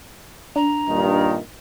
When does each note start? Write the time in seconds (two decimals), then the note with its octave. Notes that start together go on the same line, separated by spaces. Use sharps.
0.56 D4 A#5
0.89 G2 A#2 D#3